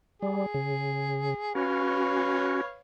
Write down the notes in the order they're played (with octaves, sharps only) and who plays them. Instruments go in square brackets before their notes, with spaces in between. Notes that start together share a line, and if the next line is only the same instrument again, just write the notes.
[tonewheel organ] G3 [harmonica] G#4
[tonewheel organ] C#3
[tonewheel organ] C#4 F#4 [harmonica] B4 C#5 F5